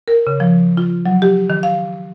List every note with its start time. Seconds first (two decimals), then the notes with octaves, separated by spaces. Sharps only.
0.08 A#4
0.27 C#3
0.40 F3
0.77 F4
1.06 F#3
1.22 G4
1.50 D#3
1.63 F5